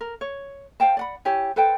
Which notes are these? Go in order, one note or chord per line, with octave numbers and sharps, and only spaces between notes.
A#4
C#5
C5 F5 G5 A5
D5 F#5 B5
E4 G4 C#5 G#5
A4 B4 C5 G5